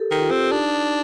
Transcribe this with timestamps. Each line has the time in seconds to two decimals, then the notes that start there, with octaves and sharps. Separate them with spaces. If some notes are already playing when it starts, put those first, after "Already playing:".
Already playing: G4 A4 A#4
0.11 D#3 G4
0.19 F4
0.27 C4 G4
0.52 D4 D#4
0.72 D#4